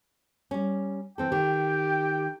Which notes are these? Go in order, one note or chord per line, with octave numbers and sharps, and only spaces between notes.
G3 C#4
E3 C4 A4 G5
D#3 G4